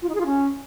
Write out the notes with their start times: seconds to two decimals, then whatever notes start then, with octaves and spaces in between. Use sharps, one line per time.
0.02 F4
0.08 D#4
0.14 G#4
0.20 F4
0.26 C#4